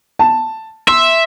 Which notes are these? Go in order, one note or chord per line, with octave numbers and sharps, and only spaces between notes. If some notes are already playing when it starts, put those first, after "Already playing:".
A5
E5 C6